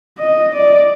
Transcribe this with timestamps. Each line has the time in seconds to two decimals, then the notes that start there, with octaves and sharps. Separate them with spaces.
0.18 D#5
0.53 D5